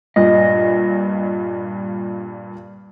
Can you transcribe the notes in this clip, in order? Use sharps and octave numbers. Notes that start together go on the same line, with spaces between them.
G2 A#2 D#5